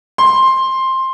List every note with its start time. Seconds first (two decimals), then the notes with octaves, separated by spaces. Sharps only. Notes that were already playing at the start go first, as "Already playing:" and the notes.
0.18 C6